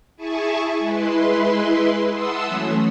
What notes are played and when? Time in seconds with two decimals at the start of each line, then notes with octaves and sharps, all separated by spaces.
0.16 E4 G#4 E5 G#5 A5 C#6
0.79 G#3 E4 B4 C6
2.11 E5 F#5 A5 C6 D#6 E6
2.46 E3 F#3 A3 C#4